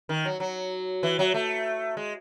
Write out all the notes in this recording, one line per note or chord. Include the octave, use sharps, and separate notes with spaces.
D#3
F#3
F#3
E3
F#3
A3
G#3